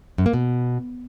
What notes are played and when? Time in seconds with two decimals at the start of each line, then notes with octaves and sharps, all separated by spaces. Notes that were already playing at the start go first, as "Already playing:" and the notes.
0.18 F#2
0.26 A#3
0.33 B2